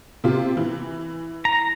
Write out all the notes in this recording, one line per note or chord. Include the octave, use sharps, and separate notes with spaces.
C3 F4 G4
E3
A#5